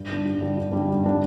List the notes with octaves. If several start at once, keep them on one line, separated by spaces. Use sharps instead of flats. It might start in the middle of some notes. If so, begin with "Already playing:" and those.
Already playing: G2
D3 G3 D4
G2
D3 G3 D4
G2
D3 G3 D4
G2
D3 G3 D4